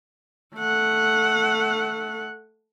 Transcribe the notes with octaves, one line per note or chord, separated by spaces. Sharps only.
A3 F#5